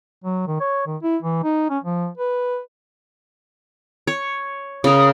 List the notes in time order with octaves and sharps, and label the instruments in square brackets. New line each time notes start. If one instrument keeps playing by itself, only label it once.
[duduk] F#3
D#3
C#5
D#3
E4
E3
D#4
C#4
F3
B4
[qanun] C#5
[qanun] C#3 A#4 [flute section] D#6